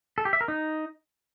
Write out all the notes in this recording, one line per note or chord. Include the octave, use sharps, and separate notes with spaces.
A4
G4
E5
A#4
D#4